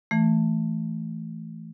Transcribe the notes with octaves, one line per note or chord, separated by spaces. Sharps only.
E3 A3